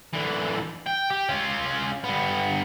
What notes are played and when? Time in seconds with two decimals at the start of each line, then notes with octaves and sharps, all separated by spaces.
0.14 D3 E3
0.87 G5
1.10 G4
1.29 C#4 F4
2.04 G2 B3